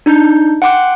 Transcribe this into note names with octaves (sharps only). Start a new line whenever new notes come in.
D4 D#4 G6
F#5 G5 C6 D6 F#6